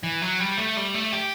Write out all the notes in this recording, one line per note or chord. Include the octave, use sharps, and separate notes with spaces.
E3
F#3
G3
A3
G3
A3
G4